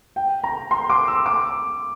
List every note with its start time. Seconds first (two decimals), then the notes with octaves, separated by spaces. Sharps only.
0.16 G5
0.44 A#5
0.71 C6
0.90 D6
1.08 E6
1.26 D6